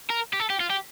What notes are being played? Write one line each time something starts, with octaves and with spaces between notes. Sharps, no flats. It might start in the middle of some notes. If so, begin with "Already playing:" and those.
A#4
G4
A4
G4
F4
G4